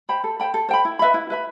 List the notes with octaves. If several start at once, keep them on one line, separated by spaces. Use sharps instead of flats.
C5 G5 B5
A4
C5 G5 B5
A4
C5 G5 B5
E4
B4 E5 B5
E4
B4 E5 B5